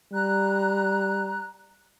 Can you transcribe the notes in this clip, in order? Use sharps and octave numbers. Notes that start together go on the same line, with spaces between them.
G3 A#5 F#6